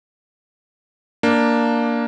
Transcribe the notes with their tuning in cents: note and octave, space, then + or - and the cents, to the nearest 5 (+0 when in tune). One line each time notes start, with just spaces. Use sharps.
A#3 +0 D4 +0